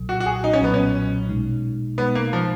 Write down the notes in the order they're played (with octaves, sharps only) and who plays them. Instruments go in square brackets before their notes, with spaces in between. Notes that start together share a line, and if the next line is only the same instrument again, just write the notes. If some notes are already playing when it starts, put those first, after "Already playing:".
Already playing: [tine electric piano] B1 A#2 F#3
[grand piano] F#4
F#4
G#4
D#4
C#4
[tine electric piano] B1 A#2 F#3 [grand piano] B3
[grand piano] C#4
[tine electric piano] B2 G#3 D#4
[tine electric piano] B2 G#3 D#4 [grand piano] B3
[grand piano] A#3
F3